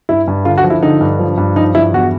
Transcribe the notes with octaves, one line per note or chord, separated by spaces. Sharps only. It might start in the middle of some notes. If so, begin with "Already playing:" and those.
G2 E4
G2
D3 F4
F#4
F3
E4
D3 D#4
G2
F3
G2
F3 D#4
G2 E4
E2 F#4